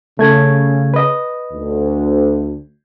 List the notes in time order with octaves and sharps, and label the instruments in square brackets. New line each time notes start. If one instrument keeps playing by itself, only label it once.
[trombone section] C#3 [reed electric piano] A3 G#6
[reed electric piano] B4 D#5
[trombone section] D2